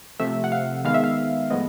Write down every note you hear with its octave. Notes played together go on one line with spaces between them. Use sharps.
C3 F3 A3 E5
F#5
F5
D#3 G#3 B3 F5
E5
F5
A2 F3 G#3 B3 D#5